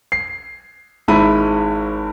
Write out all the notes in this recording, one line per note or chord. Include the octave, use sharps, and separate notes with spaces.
C7
G#1 G#2 E4 B5 D#7